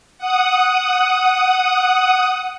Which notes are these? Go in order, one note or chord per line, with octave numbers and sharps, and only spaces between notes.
F#5 D#6